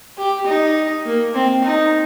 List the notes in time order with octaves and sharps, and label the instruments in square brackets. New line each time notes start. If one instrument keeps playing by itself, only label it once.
[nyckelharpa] G4
D#4
A#3
C4
D#4